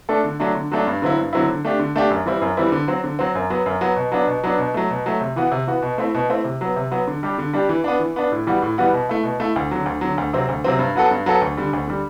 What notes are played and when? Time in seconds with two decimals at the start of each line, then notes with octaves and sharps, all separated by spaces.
0.09 A3 D4 A4
0.24 D3
0.40 F#3 A3 D4
0.55 D3
0.72 F#3 A3 D4
0.87 G2
1.02 D3 F#3 C4 E4
1.17 G2
1.33 D3 F#3 C4 E4
1.49 D3
1.65 A3 D4 G4
1.79 D3
1.96 A3 D4 G4
2.10 F#2
2.26 E3 G3 C4 E4
2.42 F#2
2.57 E3 G3 C4 E4
2.72 D3
2.88 F#3 C4
3.04 D3
3.19 F#3 C4
3.35 F#2
3.50 F#3 B3
3.66 F#2
3.81 F#3 B3
3.96 B2
4.12 F#3 B3 D4
4.27 B2
4.44 F#3 B3 D4
4.58 B2
4.74 F#3 A3
4.90 B2
5.06 F#3 A3
5.21 C3
5.36 E3 B3 F#4
5.51 C3
5.67 E3 B3 F#4
5.82 B2
5.98 A3 C4 E4
6.14 B2
6.29 A3 C4 E4
6.44 C3
6.61 F#3 B3
6.76 C3
6.91 F#3 B3
7.08 D3
7.23 G3 D4 G4
7.38 D3
7.53 G3 D4 G4
7.69 E3
7.84 B3 D4
7.99 E3
8.16 B3 D4
8.32 A2
8.47 E3 G3 B3 F#4
8.62 A2
8.78 E3 G3 B3 F#4
8.93 B2
9.09 A3 E4
9.24 B2
9.40 A3 E4
9.56 D2
9.71 D3 F#3
9.86 D2
10.01 D3 F#3
10.18 D2
10.33 C3 F#3 C4
10.48 D2
10.64 C3 F#3 C4
10.79 G2
10.95 F#3 B3 F#4 A4
11.11 G2
11.26 F#3 B3 F#4 A4
11.41 D2
11.57 D3 G3
11.73 D2
11.87 D3 G3